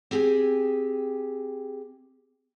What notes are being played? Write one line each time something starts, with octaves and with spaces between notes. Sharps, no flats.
C4 G4 G#4 G5 G#5